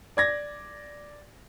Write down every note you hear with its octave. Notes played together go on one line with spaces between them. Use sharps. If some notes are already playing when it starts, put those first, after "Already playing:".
D5 G#6 A#6